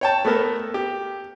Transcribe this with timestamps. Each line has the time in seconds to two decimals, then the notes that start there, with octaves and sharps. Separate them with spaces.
0.01 C#5 G5 A5
0.25 A3 B3 A4 A#4
0.74 G4